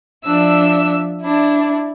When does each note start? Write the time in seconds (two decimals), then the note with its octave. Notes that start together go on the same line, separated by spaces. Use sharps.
0.24 F3 D4 E5 E6
1.22 D4 E4